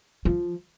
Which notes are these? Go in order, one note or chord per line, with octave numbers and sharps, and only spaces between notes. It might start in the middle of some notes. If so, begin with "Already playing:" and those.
F3